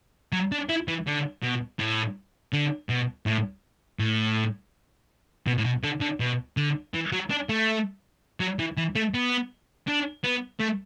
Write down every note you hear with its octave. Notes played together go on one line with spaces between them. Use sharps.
F#3
D4
E4
E3
D3
B2
A2
D3
B2
A2
A2
B2
A2
B2
D3
D3
B2
D3
E3
F#3
D4
A3
F#3
E3
E3
A3
B3
D4
B3
A3